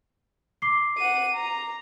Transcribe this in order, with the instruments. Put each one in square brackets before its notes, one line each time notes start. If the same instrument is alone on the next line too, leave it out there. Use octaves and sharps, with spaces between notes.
[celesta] D6 C7
[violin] F#5 D#7
A#5